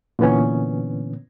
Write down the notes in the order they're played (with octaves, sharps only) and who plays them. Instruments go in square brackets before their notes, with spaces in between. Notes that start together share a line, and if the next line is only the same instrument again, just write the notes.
[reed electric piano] A#2 D3 E3 B3 C#4